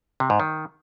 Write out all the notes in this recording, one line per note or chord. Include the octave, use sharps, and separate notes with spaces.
C3
G#2
D#3